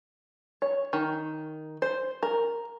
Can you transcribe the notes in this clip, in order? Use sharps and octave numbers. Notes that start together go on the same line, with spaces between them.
C#5
D#3
C5
A#4